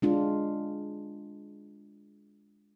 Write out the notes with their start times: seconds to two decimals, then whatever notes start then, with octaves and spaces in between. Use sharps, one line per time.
0.02 G#3 D4 F4